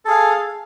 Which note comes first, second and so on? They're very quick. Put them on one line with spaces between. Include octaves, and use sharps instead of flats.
A4 G#4 F5